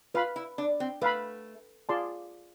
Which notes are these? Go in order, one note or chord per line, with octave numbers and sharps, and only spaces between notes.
F4 B4 F5 B5
E4
D4
C4
A3 B4 F5 B5
F4 G#4 D5 A5 C6